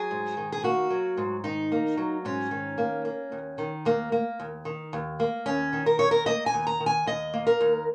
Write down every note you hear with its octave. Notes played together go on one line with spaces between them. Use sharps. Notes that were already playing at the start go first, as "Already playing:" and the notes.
Already playing: F#3 G#4
G#2
D#3
G#4
A#3 F#4
F#3
G#2
D#3 D#4
A#3
F#3
G#2 C#4
D#3
A#3
A#3
D#2
D#3
D#2 A#3
A#3
D#2
D#3
D#2
A#3
D#2 C#4
D#3
A#4
D#2 C#5
A#4
A#3 D#5
G#5
D#2
A#5
D#3
G#5
D#2 D#5
A#3
A#4
D#2